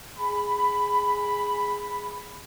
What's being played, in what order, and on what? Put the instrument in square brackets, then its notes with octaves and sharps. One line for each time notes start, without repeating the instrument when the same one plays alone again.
[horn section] G#4 B5